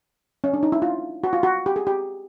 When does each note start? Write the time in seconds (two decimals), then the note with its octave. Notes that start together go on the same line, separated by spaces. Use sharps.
0.44 C#4
0.53 D4
0.63 D#4
0.72 E4
0.82 F4
1.24 F#4
1.33 F4
1.43 F#4
1.66 G4
1.76 G#4
1.87 G4